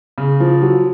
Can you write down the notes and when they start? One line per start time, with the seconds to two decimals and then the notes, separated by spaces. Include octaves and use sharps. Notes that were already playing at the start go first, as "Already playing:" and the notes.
0.18 C#3
0.40 F3
0.62 F#3